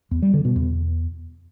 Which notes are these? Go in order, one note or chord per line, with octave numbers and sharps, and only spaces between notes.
E2
G3
D3
B2
E2